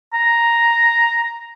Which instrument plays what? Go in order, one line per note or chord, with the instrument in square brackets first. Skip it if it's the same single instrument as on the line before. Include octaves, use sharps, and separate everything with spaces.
[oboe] A#5